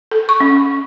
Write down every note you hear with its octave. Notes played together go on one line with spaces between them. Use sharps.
A4
C#6
C#4